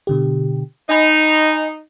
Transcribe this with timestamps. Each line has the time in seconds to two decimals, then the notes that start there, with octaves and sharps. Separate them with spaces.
0.07 B2 D3 G4
0.89 D#4 D#5 G#5 B5